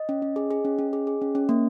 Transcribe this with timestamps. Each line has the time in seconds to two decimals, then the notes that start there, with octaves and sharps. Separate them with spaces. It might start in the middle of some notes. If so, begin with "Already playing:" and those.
Already playing: D#5
0.09 C#4
0.22 C#4
0.36 G#4
0.51 G#4
0.65 C#4
0.79 C#4
0.93 G#4
1.07 G#4
1.22 C#4
1.35 C#4
1.49 A#3